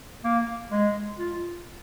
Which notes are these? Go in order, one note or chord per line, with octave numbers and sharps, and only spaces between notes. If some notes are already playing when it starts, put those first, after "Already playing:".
A#3
G#3
F4